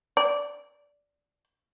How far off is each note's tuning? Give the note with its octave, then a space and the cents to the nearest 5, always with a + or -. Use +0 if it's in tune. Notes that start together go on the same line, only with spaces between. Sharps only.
D5 -10